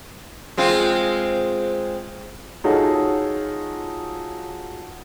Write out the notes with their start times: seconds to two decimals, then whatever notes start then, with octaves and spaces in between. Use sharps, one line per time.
0.57 G#3 C4 F4
2.64 D#4 F4 F#4 G#4 A4 C#5